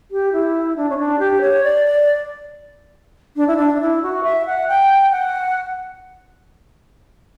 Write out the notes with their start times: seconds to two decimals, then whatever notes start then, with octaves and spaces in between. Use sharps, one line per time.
0.11 G4
0.32 E4
0.76 D4
0.89 C#4
0.98 D4
1.19 G4
1.41 C#5
1.63 D5
1.85 D5
3.36 D4
3.47 E4
3.57 D4
3.75 D4
3.80 E4
4.02 F#4
4.23 E5
4.46 F#5
4.68 G5
5.11 F#5